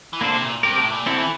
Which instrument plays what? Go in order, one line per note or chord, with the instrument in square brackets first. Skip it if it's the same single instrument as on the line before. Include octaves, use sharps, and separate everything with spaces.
[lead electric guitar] E3
[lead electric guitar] D3 [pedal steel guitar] A#3 D4 A4 C5
[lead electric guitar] C3
A#2
[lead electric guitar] G2 [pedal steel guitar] C4 G4 A#4
[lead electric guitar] A2
A#2
[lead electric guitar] D3 [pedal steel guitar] C4 E4 A4
[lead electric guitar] E3